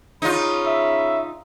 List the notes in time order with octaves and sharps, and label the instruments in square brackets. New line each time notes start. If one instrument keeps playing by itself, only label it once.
[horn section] C#3 C#4 B5 [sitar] D#4 F4
[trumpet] E5